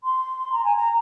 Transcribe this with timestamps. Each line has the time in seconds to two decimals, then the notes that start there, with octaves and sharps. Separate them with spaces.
0.04 C6
0.52 A#5
0.64 G#5
0.76 A#5